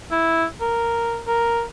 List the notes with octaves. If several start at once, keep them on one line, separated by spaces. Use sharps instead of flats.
E4
A#4
A#4